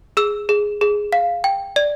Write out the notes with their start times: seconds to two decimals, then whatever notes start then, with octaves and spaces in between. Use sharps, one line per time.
0.17 G#4 E6
0.49 G#4
0.81 G#4
1.12 F5
1.44 G5
1.76 D5